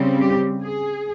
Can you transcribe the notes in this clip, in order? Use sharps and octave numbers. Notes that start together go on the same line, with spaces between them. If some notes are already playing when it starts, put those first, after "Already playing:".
Already playing: C#3 G3 C4
G4
G#4